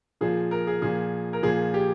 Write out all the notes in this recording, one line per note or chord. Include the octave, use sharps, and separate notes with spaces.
A#2 F3 G#4
A#4
G#4
A#2 F3 G#4
A#4
A#2 F3 G#4
G4